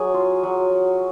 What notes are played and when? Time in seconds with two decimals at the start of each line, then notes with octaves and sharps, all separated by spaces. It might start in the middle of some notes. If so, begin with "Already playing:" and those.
Already playing: F#3 G#4
0.14 F4
0.43 F#3